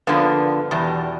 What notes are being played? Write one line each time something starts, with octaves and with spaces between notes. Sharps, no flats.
G2 D3 F3 A#3 B3
E2 B2 G3